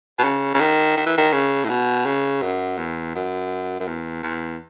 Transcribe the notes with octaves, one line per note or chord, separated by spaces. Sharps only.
B2
C#3
C#3
D#3
D#3
E3
D#3
C#3
A2
B2
C#3
F#2
E2
F#2
F#2
E2
E2